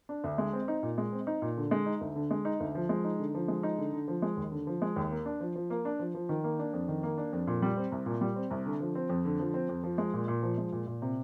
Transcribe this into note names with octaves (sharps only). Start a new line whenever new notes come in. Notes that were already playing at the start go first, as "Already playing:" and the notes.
D4
D2
G#3
C4
D#4
A#2
G#3
C4
D#4
A#2
D3
G#3
D#4
D2
D3
G#3
D#4
D2
F3
G#3
D#4
D3
F3
G#3
D#4
D3
D3
F3
G#3
D#2
D3
F3
G#3
D#2
A#3
D4
F3
F3
A#3
D4
F3
F3
D#3
A#3
D4
F2
D#3
A#3
D4
F2
A#2
G3
C4
C2
A#2
G3
C4
C2
D3
F3
C4
F2
D3
F3
C4
F2
F3
G#3
A#2
A#2
F3
G#3
A#2
A#2
C3